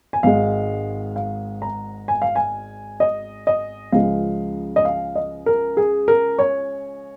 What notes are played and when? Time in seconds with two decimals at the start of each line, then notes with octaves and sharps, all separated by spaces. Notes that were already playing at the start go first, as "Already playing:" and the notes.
0.13 G#5
0.23 G#1 G#2 G#3 F5
1.16 F5
1.62 A#5
2.08 G#5
2.22 F5
2.36 G#5
3.00 D#5
3.47 D#5
3.92 C#2 C#3 F3 G#3 F5
4.76 D#5
4.85 F5
5.15 D#5
5.46 A#4
5.77 G#4
6.08 A#4
6.39 C#5